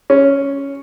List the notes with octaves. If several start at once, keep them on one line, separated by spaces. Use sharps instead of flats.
C#4